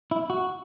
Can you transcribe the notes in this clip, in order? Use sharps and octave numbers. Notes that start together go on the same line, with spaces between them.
E4
F#4